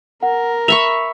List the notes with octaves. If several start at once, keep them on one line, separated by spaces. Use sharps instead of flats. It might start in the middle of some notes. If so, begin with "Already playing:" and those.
A#4 F#5
E5 B5 C#6 F7